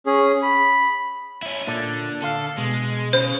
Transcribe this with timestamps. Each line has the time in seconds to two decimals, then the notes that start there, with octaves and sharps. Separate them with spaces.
0.06 C#4 G#4
0.43 B5
1.43 C#4 E4
1.67 A#2 D3 D4 A4
2.22 D3 A4 F5
2.58 B2 G#3
3.13 C#3 C5